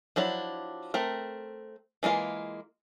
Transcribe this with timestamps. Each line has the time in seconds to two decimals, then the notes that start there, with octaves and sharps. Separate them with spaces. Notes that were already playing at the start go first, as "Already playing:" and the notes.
0.16 F3 F#3 D4 E4
0.94 A3 C4 A#4
2.03 E3 G#3 A#3 F4